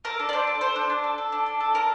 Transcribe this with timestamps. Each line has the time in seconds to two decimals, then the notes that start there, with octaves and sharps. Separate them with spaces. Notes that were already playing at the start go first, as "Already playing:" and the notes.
0.05 A4 A#4
0.19 D4
0.29 D5
0.33 D4 C5
0.47 A4
0.61 A4 C5
0.76 D4
0.90 D4
1.04 A4
1.18 A4
1.32 D4
1.46 D4
1.60 A4
1.74 A4 A#4